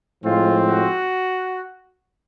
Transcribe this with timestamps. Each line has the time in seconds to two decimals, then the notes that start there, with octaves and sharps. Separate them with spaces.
0.24 A2 F3 G#3 C4 F4
0.68 F#4